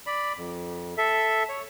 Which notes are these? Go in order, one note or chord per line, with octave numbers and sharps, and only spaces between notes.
D5 B5
F2
A4 E5
C#5